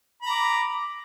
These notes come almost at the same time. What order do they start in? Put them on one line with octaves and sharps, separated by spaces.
B5 A#5 D6